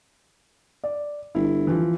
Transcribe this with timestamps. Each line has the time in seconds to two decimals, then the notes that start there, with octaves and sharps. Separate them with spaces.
0.84 D5
1.35 G1 E4
1.67 E3 F3